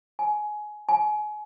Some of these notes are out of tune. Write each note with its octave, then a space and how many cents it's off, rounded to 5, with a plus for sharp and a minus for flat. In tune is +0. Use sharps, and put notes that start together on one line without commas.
G#5 +20
G#5 +30